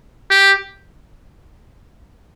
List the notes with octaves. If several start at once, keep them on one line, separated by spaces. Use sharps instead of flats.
G4